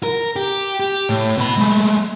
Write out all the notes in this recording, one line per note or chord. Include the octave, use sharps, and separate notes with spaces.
A#4
G4
G4
A2
B2 B5
G#3 A3